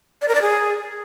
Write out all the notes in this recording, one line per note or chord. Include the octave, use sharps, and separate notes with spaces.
D5
A#4
D5
G#4